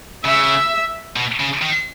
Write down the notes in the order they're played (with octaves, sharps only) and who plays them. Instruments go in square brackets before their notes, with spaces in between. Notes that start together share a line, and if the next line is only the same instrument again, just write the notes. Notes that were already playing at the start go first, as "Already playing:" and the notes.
[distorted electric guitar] C#3 [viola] E5
[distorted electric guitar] B2
C#3
D#3